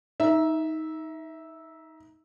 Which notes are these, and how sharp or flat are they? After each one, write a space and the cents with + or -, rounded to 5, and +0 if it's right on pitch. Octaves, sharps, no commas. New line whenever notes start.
D#4 +20 E5 -10